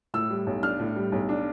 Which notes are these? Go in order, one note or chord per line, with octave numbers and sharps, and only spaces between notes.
A2 E6
G3
B1
D4 F6
A2
G3
B1
D4